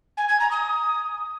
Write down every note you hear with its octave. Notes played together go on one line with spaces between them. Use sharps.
G#5
G#6
A#5
D#6